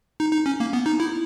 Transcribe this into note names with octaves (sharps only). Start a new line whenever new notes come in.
D#4
D#4
C#4
A#3
B3
D#4
E4